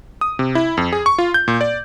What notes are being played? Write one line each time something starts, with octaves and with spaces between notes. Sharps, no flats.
D#6
C3
E4
F2
G#4
C#6
F4
G6
A#2
D5